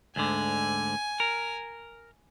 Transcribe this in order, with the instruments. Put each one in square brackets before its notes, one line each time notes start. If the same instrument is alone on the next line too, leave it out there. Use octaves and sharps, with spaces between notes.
[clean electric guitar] D2 G#2 D3 [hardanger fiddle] G#5
[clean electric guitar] A#4